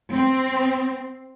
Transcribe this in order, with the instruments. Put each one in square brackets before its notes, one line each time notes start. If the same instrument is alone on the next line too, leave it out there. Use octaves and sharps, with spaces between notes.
[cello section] C4